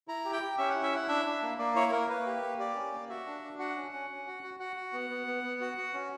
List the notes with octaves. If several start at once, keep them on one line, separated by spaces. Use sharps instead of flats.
E4 A#5
G4
G5
G4
C#4 E5
E4 F#5
E5
E4 F#5
D4 E5
D4
A#3
A#3 D5
E4 C#5
A#3 A#4
A#3 B4
G4
A#3
G4 D5
C#4
A#3
F#4 E5
D4
D4
F#4 F#5
C#4
C#4
C#4
F#4
F#4
F#4 F#5
F#4
B3
B3
B3
B3
F#4
F#4
C#4